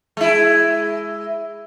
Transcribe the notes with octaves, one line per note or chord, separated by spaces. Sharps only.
G#3 E4